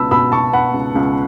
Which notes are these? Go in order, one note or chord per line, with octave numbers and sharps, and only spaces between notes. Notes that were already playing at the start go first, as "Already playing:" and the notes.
Already playing: C#2 B2 B3 A5 B5 E6
B2 B5 E6
B2 A5 C#6
B3 F#5 B5
C#2
C#2